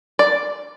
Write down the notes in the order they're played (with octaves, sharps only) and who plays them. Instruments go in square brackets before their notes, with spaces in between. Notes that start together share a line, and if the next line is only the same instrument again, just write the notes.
[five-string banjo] D5